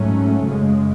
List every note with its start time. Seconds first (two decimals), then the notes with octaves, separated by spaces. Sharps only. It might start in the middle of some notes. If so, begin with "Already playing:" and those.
Already playing: G#2 F#3 A3 C#4
0.46 F#2 C#3 G#3